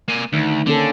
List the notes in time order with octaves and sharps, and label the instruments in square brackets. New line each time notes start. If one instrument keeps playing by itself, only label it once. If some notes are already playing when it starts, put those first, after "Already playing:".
[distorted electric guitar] A#3 G#5
[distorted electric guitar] D2 [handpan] D#3
[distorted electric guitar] D3 [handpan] A#3 C#4 A4